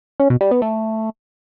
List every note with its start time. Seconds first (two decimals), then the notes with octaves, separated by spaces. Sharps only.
0.20 C#4
0.30 B2
0.41 G3
0.51 B3
0.62 A3